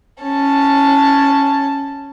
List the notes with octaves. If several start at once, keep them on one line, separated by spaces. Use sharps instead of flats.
C#4 A5